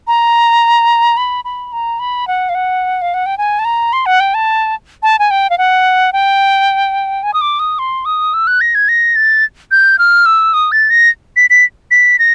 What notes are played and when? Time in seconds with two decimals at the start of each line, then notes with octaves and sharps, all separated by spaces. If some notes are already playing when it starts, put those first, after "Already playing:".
0.07 A#5
1.17 B5
1.45 B5
1.72 A#5
2.00 B5
2.28 F#5
2.49 F5
2.55 F#5
3.02 F5
3.14 F#5
3.26 G5
3.38 G#5
3.59 A5
3.65 A#5
3.93 C6
4.06 F#5
4.20 G5
4.34 A5
5.03 A5
5.19 G#5
5.31 G5
5.50 F5
5.58 F#5
6.13 G5
7.23 G#5
7.34 D#6
7.41 D6
7.59 D#6
7.79 C6
8.05 D#6
8.34 E6
8.47 F#6
8.61 A#6
8.75 G#6
8.89 A#6
9.16 A6
9.71 G6
9.99 F6
10.26 E6
10.54 D#6
10.72 A6
10.90 A#6
11.36 B6
11.50 B6
11.91 B6
12.19 A#6